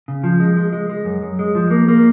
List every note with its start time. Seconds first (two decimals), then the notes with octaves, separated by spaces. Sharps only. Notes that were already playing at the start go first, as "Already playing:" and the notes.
0.08 C#3
0.24 F3
0.40 G#3
0.56 G#3
0.73 G#3
0.90 G#3
1.05 F#2
1.22 F#2
1.39 G#3
1.55 F3
1.71 A#3
1.88 A#3